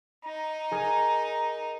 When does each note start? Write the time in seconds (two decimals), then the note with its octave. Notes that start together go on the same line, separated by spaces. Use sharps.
0.25 D#4 A#5
0.72 G#4 A#4